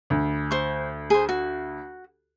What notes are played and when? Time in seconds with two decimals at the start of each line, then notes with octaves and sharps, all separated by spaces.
0.10 D2
0.51 C5 C#6
1.10 G#4 C5
1.29 F#4